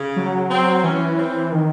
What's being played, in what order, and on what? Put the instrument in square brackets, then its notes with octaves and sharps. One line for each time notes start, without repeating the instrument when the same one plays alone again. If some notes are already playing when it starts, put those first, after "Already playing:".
Already playing: [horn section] C#3
[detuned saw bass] F#3
[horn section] C4
[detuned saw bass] E3 [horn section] C#4
[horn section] C4
[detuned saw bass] D#3